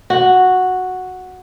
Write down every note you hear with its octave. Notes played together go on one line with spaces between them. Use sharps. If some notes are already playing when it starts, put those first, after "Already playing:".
F#4